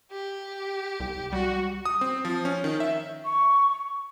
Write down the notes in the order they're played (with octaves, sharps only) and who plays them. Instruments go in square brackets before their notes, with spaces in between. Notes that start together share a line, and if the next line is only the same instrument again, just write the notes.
[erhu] G4
[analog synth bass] C2
[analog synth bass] G3 [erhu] F#4
[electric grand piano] D#6
C4
F3
C#4
D#3
E5
[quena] C#6